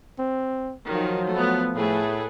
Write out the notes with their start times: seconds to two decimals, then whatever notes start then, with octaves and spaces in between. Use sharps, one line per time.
0.19 C4
0.91 D#3 F3 F#3 F4
1.32 A3 B3
1.75 A2 A3 G#4 B4